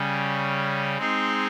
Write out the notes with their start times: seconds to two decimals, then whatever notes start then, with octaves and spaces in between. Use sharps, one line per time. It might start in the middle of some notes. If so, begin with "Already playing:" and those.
Already playing: C#3 G3 C#4
0.97 G#3 C4 D#4 G#4 D#5